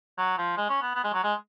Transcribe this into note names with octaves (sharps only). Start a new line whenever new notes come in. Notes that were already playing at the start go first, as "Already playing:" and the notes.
F#3
F3
G#3
C#4
B3
B3
G#3
F#3
G#3